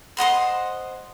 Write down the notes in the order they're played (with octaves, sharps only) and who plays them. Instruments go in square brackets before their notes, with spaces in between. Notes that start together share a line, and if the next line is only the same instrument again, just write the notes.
[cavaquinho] C5 D#5 F#5 C6